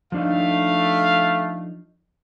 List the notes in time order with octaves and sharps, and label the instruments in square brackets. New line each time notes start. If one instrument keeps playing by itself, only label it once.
[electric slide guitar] F3 D4 D#4 [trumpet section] A3 F5